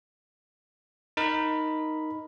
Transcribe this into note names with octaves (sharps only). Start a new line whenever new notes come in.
D#4 A#4 B5